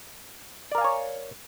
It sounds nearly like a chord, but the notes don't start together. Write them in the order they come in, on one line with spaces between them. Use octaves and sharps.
D5 A#4 F5 G#5 C#5